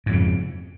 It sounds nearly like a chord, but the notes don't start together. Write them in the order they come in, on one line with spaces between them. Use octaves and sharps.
G#2 F2 C#3